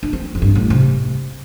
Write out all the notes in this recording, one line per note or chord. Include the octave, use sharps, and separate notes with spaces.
D4
C4
F2
G2
A2
C3